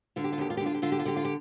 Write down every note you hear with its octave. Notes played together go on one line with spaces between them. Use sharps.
D3 F4
G4
F4
D#2 G4
F4
D3 G4
F4
G4
D3 F4
G4
F4
D3 G4
F4
G4